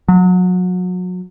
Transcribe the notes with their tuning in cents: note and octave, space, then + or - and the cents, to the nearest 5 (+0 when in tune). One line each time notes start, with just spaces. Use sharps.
F#3 -30